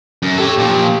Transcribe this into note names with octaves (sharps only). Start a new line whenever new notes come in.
F#2
G4 A4 C#5
A#2 F3